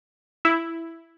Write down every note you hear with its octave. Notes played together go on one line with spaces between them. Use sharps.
E4